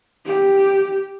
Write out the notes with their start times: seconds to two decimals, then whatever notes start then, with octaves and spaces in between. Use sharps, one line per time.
0.26 G4